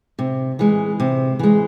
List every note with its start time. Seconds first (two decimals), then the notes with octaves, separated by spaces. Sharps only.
0.19 C3
0.59 E3 G#3
1.00 C3
1.39 E3 G#3